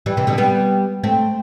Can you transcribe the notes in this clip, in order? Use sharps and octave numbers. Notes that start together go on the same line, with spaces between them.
E3 G3
C3 E3
B2 D3
G3 B3
A3 C4